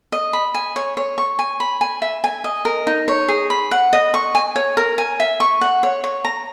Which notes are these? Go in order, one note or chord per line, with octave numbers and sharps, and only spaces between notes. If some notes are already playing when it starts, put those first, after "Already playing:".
D#5
B5
G#5
C#5
C#5
C#6
G#5
B5
G#5
E5
G#5
D#5
A#4
D#4
C#5
G#4
B5
F#5
D#5
C#6
G#5
C#5
A#4
G#5
E5
C#6
F#5
C#5
C#5
A#5